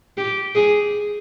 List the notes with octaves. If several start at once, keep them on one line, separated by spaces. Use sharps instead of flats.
G4
G#4